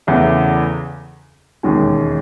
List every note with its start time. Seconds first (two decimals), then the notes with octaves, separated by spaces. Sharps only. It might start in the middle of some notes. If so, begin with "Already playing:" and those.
0.07 E2 C#3 E3 A3
1.63 E1 D#2 D#3 G#3 C#4